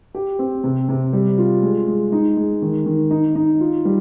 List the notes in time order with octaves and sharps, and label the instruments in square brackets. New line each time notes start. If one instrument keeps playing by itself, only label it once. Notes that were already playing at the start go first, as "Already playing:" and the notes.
[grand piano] G4
C4
C3
C3
G3
F4
G#3
G#3
D#4
G#3
D#3
D#3
D#4
D#4
F4
G3